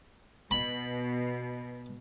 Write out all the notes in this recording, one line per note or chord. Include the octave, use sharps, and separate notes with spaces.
B2 B5